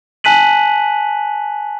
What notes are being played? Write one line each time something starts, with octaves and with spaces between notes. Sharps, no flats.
G#5 A5 F#6 B6 D#7 F#7